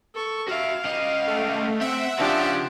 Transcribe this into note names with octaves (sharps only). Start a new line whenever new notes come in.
A4 C#6
F#4 E5 F5
C#3 D#5
A3
C4 E5 F#5
C#3 F3 D4 G4